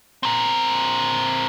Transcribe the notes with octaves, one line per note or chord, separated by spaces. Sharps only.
C4 A#4